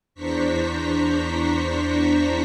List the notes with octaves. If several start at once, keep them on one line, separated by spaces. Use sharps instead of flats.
E2 D4 C5 A#5 C#6 B6